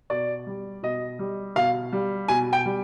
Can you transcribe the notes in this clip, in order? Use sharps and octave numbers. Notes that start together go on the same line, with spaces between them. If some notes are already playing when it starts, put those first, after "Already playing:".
B2 D5
G3
B2 D#5
G3
B2 F5
G3
B2 G#5
G5
G3